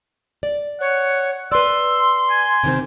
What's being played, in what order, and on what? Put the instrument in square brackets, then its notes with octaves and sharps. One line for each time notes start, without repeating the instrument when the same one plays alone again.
[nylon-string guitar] D5
[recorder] C#5 [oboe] F#5
[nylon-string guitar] B4 D5 [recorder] C6 [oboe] E6
[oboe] G#5
[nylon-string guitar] C3 D#3 C4